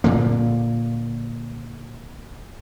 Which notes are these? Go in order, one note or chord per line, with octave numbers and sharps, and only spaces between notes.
A#2 D3 A#3